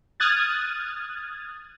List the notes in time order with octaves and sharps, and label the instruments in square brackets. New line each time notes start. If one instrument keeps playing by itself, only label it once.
[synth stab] D#6 F6 F#6 G#6 A6